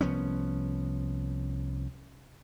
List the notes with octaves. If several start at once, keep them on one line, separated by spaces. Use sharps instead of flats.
C2 F3 B3 C#4